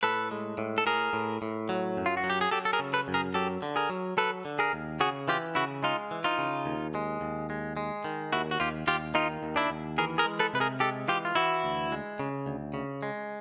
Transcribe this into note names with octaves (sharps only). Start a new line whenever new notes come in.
A2 A4 B4
G#3
A2
A4
A2 G#4 A#4
A2
A2
F#3
F#2
F4
F#4
F#3
G4
G#4
F#3 G4 A4
A4
G#4 A#4
C#3
A4 B4
F#2
G#4 A#4
F#3 G4 A4
D3
G#4 A#4
F#3
F#3 A4 B4
D3
G#4 A#4
D#2
C#3 F#4 G#4
E3 F4 G4
C#3 E4 F#4
G#3 D#4 F4
E3
D#4 F4
C#3
D#2
G#3
D#2
G#3
G#3
D#3
D#2 E4 F#4
F#4
D#2 F4 G4
D#2 F4 G4
D#3 D#4 F4
D#2
D4 E4
D#2
E3 G#4 A#4
G#4 A#4
G#3
A4 B4
C3 B4
G#4 A#4
G#3 G4 A4
E3 F4 G4
F4
E3 E4 F#4
D2
G#3
C#3
D2
C#3
G#3